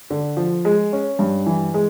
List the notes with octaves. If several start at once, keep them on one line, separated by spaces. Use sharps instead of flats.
D3
F3
G#3
C#4
G2
E3
G#3